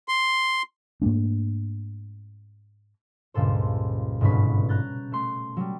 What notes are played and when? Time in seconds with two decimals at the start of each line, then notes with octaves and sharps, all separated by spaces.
0.08 C6
1.02 G#2 A3 A#3 D4
3.34 C#2 G2 A#2 A4 C5
4.21 G1 G#2 B2 C#4 B5
4.69 A#5 F#6 G6 A6
5.12 A3 C6
5.57 F#3 G3